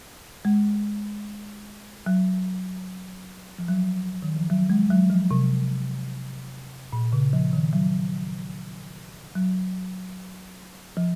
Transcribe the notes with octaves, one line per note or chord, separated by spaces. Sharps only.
G#3
F#3
F3
F#3
D#3
F3
F#3
G#3
F#3
F3
C3
A#2
C#3
F3
D#3
F#3
F#3
F3